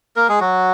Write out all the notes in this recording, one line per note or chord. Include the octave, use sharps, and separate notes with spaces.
A#3 A#4
G#3 G#4
F#3 F#4